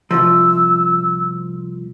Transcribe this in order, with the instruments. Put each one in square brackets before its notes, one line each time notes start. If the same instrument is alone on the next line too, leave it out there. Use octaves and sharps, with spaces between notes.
[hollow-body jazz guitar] C2 G#2 F3 [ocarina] E6